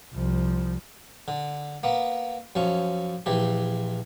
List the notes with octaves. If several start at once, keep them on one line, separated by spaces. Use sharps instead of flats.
C2 F3
D3
A#3 B3
F#2 F3 C#4
A#1 E3 G4